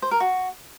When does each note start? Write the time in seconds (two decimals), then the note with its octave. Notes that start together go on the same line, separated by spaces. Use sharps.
0.02 C5
0.11 A#4
0.20 F#4